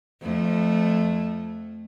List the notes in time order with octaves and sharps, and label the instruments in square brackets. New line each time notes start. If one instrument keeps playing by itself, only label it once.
[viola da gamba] F2 A3